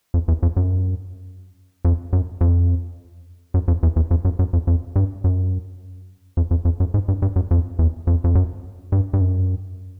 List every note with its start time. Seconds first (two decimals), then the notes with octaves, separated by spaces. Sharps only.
0.14 F2
0.28 E2
0.43 F2
0.56 F#2
1.85 F2
2.13 F#2
2.41 F2
3.54 F#2
3.68 F2
3.83 E2
3.96 E2
4.11 F2
4.25 F#2
4.39 F#2
4.53 F2
4.67 F2
4.96 G2
5.24 F#2
6.37 F2
6.51 F2
6.65 F2
6.80 F#2
6.94 G#2
7.08 G2
7.22 G2
7.36 F#2
7.51 F2
7.79 E2
8.07 F2
8.24 F2
8.35 F#2
8.92 G2
9.13 G2
9.21 F#2